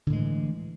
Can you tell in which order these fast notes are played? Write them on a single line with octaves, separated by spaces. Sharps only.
D3 A2 G#3 E3